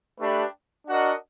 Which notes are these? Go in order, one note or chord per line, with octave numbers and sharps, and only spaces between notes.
A3 D4 G4 B4
D4 F#4 A#4 D#5 F#5